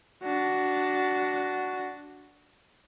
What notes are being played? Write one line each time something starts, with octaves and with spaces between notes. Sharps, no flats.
D4 F#4